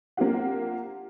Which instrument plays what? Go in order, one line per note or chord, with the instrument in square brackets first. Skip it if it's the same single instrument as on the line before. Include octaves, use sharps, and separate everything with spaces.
[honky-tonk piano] A#3 D4 F4 G4 F#5